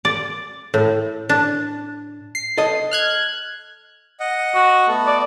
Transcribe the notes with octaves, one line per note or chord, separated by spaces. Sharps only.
D5
A2
D4
C7
A4 D#5
F6 F#6 G#6
D#5 F#5
F#4
A3 B3 A4
D5